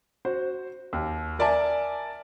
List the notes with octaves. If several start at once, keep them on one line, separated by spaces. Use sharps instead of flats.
F#4 C5
D#2
A#4 D5 E5 G#5 A5